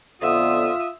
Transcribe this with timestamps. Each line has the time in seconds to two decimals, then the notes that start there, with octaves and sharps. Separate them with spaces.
0.22 F2 D3 B3 F4 E5 D#6